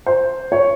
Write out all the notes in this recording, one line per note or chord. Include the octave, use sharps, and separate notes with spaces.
C5
C#5